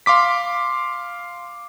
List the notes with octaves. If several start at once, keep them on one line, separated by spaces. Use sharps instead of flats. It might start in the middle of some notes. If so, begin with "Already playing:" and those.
F5 C6 D6 B6